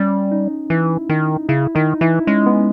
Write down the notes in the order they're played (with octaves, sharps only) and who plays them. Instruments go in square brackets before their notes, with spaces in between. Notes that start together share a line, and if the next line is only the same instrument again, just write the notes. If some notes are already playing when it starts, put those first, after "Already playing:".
Already playing: [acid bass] G3 [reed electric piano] C#4
[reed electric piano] D#4
[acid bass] E3 [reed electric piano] E4
[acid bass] D#3 [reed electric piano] D#4
[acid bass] C#3 [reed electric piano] E4
[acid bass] D#3 [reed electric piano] D#4
[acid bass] E3 [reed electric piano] E4
[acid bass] G#3 [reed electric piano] C#4
[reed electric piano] B3